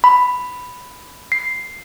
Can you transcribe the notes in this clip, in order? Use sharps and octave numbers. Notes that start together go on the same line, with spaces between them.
B5
C7